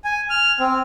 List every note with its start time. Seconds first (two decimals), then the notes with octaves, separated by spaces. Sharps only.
0.04 G#5
0.30 F6
0.60 C4